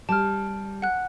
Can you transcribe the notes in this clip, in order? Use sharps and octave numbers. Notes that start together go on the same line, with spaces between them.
G3 A5 F6
F#5 F#6